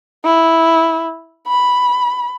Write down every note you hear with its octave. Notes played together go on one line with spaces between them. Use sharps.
E4
B5